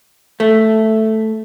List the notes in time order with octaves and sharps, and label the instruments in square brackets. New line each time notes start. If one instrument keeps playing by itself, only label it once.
[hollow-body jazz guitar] A3